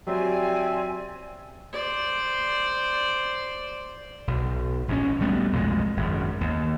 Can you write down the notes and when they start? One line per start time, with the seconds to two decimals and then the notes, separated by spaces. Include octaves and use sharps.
0.07 F#3 C4 G4 D5 E5 G#5
1.73 C5 D5
4.27 B1
4.88 A#1 G#2 C#3 C#4
5.20 D2 G3 A3 B3
5.53 B1 F2 A#2 G#3
5.97 G#1 F#2
6.41 D#2